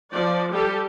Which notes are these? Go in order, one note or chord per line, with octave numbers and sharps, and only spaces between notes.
F3 D5
G3 G4 A4